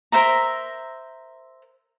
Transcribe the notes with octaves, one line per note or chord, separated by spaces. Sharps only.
A#4 C5 E5 A#5